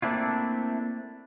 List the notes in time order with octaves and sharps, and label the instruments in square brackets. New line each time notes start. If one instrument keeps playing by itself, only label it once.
[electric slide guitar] A3 A#3 C4 D4 E4 F4